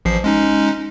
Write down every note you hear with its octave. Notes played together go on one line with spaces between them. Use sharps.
A1 F3 C7
G#3 C#4 D#4